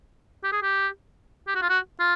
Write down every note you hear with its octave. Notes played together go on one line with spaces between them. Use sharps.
G4
G#4
G4
G4
F#4
F4
F#4
F4